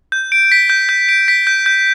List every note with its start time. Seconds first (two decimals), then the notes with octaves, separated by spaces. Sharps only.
0.12 G6
0.32 D7
0.52 B6
0.70 G6
0.89 G6
1.09 D7
1.28 B6
1.47 G6
1.66 G6